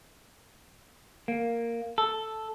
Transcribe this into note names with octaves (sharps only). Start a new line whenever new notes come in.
A#3
A4